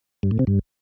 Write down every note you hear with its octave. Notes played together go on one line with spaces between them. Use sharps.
G2
A2
C3
G2